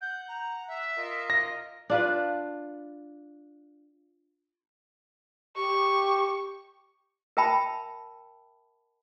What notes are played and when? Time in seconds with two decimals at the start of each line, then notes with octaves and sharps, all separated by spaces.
0.02 F#5 G6
0.28 A#5
0.68 E5
0.97 F4 A#4 D#5
1.30 A#6
1.90 D4 F4 B4
5.57 G4 C#6
7.37 A#4 E5 G5 A5 B5